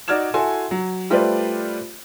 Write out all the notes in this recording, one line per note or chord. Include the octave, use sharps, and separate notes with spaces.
D#4 F#4 D5 F6 G#6 E7
E4 F#4 A4 G#5 C6
F#3
G3 A3 F4 B4 C5 D5